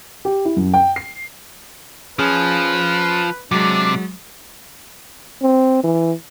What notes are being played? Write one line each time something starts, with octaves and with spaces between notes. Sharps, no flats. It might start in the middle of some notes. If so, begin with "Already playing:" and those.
G4
E4
F#2
G5
C7
F3 C#4 G#4 B4
C3 F#3 G#3 D4
C4
E3